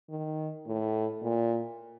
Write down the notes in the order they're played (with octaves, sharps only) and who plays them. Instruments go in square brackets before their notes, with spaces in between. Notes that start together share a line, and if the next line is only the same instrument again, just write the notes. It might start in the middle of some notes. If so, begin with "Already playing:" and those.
[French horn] D#3
A2
A#2